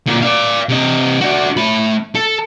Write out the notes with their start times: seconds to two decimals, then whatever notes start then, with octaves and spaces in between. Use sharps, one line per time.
0.06 A#2 D3
0.23 D5 F5
0.69 C3 D#5
1.21 D4 F#4
1.57 A3 B5
2.15 A4